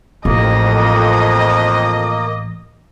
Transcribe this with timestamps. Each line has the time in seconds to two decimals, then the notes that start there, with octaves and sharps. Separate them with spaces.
0.25 A1 F2 A#3 D#5